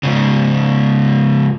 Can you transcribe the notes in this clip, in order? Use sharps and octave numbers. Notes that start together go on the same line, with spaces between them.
G#2 C#3